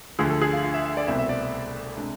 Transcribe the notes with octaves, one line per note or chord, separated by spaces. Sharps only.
D2 D3 F3 A3 G#4
A4
G#4
F4
F4
E5
E5
D5
C2 B2 A3 C4 E5
E5
D5
E5
C3 G#3 D4